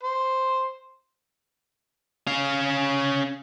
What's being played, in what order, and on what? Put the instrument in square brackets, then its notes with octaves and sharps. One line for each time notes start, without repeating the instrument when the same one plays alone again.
[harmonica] C5
[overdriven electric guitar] C#4 F5